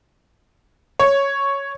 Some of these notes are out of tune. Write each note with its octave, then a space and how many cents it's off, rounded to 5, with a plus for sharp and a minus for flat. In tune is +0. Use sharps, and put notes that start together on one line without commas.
C#5 +0